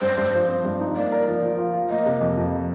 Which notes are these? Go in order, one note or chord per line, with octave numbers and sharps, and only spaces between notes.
G2 C5
G2
F3
C4
G2
D#4
A#3 D5
A#4
F3
F3
F4
F4
A#3 D#5
C3
F2
F2